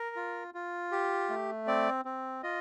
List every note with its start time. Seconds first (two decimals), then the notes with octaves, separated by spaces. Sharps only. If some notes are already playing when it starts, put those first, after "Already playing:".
Already playing: A#4
0.16 F4
0.54 F4
0.92 G4
1.29 A3
1.67 C4 D5
2.05 C4
2.43 F4 D#5